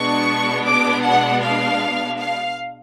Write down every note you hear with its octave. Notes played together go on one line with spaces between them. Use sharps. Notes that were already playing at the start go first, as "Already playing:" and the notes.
Already playing: B2 G#3 B3 D4 C#6
D6
F#5
F5
F5